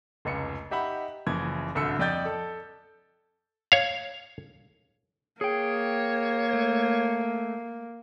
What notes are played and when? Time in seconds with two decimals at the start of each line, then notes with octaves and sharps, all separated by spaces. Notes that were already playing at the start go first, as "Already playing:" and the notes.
0.25 F1 C#2 C#7
0.71 D#4 G4 E5 F#5 B5
1.27 F#1 E3 F3 G#6
1.75 D1 C2 D3 E6 C#7
1.99 F2 D5 D#5 G5 G6 A6
2.25 A4
3.72 C#5 F5
5.41 A#3 G#4 C#5 G5
6.53 A3